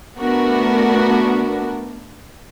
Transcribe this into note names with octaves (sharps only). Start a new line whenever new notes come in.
A3 B3 D4 F#4 A#4